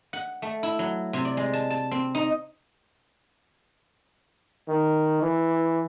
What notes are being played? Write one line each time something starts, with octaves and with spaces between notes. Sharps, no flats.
F#5
A3
E4
F#3
C3
D5
G#3
A5
A5
C4
D#4
D#3
E3